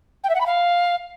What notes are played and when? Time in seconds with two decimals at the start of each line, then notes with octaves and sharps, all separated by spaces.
0.24 G5
0.29 E5
0.35 F#5
0.41 B5
0.46 F5